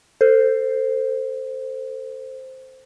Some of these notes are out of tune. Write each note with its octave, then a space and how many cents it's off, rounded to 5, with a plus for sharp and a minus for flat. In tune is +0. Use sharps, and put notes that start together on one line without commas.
A4 +30 C5 +0